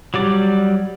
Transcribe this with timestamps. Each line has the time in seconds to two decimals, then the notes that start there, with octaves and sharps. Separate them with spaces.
0.14 F#3 G3 D5